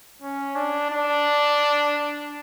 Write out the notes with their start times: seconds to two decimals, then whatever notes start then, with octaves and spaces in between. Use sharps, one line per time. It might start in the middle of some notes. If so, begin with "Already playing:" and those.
0.22 C#4
0.56 D4
0.90 D4